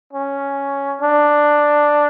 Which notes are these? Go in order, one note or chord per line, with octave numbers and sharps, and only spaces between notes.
C#4
D4